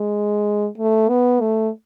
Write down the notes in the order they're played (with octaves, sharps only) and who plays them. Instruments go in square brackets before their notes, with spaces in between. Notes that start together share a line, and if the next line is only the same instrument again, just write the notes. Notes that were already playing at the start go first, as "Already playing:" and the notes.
Already playing: [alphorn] G#3
A3
B3
A3